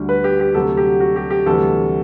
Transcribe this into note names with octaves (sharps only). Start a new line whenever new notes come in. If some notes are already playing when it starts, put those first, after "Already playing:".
Already playing: D2 D3 G3
B4
G4
G4
D2 C3 F#3 A4
G4
F#4
G4
G4
D2 C3 E3 G3 A4